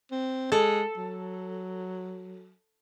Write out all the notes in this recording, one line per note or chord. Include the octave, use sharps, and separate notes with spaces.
C4
G#3 A4
F#3